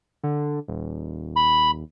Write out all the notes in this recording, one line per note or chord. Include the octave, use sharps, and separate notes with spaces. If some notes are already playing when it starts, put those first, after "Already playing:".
D3
D#1
B5